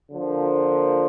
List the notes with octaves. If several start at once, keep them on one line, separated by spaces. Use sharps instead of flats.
D3 F3 A#3